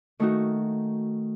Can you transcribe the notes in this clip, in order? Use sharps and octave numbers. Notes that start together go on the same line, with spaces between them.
D#3 A3 D#4 F#4